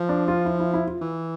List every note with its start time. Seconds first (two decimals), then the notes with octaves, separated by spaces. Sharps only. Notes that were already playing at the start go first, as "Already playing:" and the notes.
Already playing: F3
0.09 D4
0.28 F4
0.45 E4
0.60 E4
0.74 E4
0.87 F4
1.02 E3